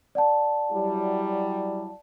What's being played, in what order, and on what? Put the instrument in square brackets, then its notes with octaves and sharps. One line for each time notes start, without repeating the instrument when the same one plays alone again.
[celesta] D5 F#5 A5
[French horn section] F#3 G3 E4